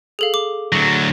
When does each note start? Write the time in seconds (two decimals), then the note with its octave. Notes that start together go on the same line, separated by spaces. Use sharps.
0.19 G#4 A4 F5
0.34 D6
0.72 D2 F#3